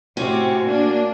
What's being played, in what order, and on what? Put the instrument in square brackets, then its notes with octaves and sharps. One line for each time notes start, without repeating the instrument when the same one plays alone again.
[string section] A2 C3 C4 [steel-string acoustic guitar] C#4 F#4
[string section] A#3 D4